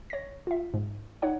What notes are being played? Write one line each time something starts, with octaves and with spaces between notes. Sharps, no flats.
C#5 A#6
F4 E5
G#2
D#4 C#5 F#5